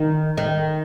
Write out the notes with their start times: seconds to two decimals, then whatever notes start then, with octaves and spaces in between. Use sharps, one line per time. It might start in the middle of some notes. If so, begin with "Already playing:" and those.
Already playing: D#3
0.37 D#3